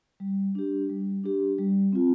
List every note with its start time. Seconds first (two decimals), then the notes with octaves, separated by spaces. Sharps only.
0.20 G3
0.55 D4 G4
0.89 G3
1.24 D4 G4
1.58 G3
1.93 C4 F4